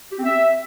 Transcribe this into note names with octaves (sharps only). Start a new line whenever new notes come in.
G4
C4
E5